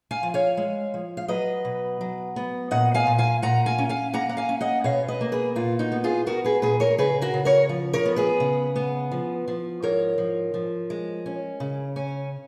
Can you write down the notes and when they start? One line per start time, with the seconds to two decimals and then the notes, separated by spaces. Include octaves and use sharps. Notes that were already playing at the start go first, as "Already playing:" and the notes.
0.11 F5 G#5
0.23 F3
0.34 C#5 F5
0.57 G#3
0.94 F3
1.17 F5
1.28 F#3 B4 D#5
1.65 B2
2.01 F#3
2.36 B3
2.71 A#2 D#5 F#5
2.94 F5 G#5
3.07 A#2
3.18 F5 G#5
3.42 A#2 F#5 A#5
3.66 F5 G#5
3.78 C#4
3.89 F5 G#5
4.13 A#3 F#5 A#5
4.29 F#5
4.37 F5 G#5
4.49 C#4
4.61 D#5 F#5
4.84 B2 C#5 F5
5.08 B4 D#5
5.21 A#3
5.32 G#4 B4
5.55 A#2 F4
5.79 D#4 F#4
5.92 B3
6.04 F4 G#4
6.26 B3 F#4 A#4
6.44 G#4 B4
6.62 A#2 G#4 B4
6.80 A#4 C#5
6.98 C#3 G#4 B4
7.21 F#4 A#4
7.34 C#3
7.45 A#4 C#5
7.69 F3
7.93 A#4 C#5
8.05 B3
8.16 G#4 B4
8.40 C#3
8.76 B3
9.11 F3
9.48 F3
9.82 G#2 A#4 C#5
10.18 F3
10.54 F3
10.90 G#3
11.26 C#4
11.60 C#3
11.96 C#4